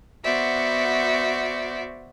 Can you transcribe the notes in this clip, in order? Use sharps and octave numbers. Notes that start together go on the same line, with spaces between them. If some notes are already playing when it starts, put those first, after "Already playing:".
B3 F#4 C5 D5 E5